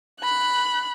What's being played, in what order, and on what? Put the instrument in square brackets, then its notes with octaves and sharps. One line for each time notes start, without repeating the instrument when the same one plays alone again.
[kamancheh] B5 F#6